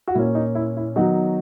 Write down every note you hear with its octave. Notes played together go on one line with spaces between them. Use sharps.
F#4
A#2 A#3 C#4 E4
D#4
E4
E4
D#3 F#3 B3 D#4 F#4